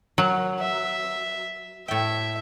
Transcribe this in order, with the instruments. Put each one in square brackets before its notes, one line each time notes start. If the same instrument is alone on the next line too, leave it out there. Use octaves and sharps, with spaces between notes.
[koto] F#3 [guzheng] A#4
[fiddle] E5
[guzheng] A2 G5 [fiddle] E5